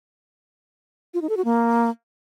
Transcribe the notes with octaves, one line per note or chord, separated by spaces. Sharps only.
F4
D#4
A4
F#4
A#3